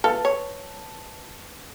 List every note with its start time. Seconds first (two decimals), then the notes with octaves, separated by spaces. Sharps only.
0.04 A4 B4 F5 A5
0.25 C#5